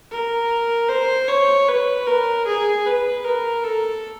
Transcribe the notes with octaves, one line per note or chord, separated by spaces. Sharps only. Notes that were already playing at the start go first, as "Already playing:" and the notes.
A#4
C5
C#5
B4
A#4
G#4
B4
A#4
A4